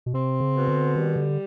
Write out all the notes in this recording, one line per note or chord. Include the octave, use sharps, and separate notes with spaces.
B2
C3 C4
C#3
B2
D3
D#3 G3
D3